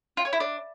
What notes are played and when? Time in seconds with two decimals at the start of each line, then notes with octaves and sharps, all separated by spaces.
0.17 F4
0.25 C#5
0.33 E4
0.40 D4